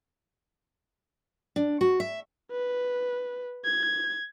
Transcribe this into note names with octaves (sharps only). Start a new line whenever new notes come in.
D4
F#4
E5
B4
G#6